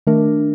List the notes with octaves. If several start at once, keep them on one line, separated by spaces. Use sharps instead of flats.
D#3 A3 D4 A#4